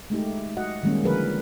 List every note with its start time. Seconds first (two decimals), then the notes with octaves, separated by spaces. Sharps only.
0.10 G#3 A3 D#4 G4
0.57 F#4 D#5 F#5
0.83 D#3 G3 G#3 A#3 C#4
1.04 D3 F3 G#4 A#4 B4